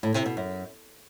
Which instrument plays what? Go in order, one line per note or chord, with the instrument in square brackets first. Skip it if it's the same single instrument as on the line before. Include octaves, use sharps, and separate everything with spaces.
[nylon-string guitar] A2
C3
B2
F#2